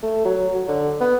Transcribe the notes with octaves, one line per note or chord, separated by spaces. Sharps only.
A3
F#3
F#3
D3
B3